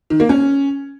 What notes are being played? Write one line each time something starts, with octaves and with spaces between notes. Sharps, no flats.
D#3
A#3
C#4